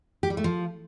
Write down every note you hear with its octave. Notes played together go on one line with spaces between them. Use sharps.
G4
G3
A3
F3